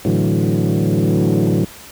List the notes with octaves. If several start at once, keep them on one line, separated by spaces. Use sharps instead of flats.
A2 D3 E3 F#3